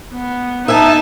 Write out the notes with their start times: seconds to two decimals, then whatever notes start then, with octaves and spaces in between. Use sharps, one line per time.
0.14 B3
0.68 D#4 E5 G#5 A5